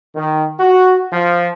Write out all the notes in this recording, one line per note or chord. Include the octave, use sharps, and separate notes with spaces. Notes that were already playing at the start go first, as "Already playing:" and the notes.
D#3
F#4
F3